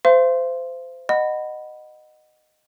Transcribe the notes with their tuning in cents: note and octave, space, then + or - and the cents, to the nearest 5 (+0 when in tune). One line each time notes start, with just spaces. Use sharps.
C5 -25 F5 -45 C6 +0
D#5 -15 F#5 +5 B5 +0